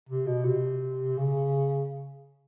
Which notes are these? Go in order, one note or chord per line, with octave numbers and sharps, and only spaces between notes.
C3
B2
C3
C#3